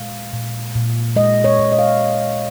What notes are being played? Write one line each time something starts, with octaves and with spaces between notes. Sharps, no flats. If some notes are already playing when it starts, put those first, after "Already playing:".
Already playing: A#2 G#3 F5
A#2
A#2
G#3 D#5
C#5
A#2
D#5
F5